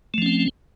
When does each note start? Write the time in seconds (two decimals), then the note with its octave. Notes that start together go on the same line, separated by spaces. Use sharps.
0.14 A3
0.18 F3
0.22 C#4
0.26 C4